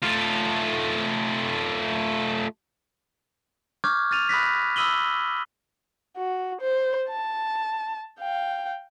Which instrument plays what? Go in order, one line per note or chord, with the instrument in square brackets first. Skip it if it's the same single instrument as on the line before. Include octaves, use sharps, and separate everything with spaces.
[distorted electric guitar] A3 F4
[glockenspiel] C#6 D6 F6 G6 G#6
F6 A6 D#7 F7
B5 D#6 F#6 A#6 B6
B5 D#6 E6 D#7 F#7 G7
[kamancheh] F#4
C5
A5
F5 G5